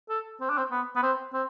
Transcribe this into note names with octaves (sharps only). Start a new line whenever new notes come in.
A4
C4
D4
C4
B3
B3
C4
C4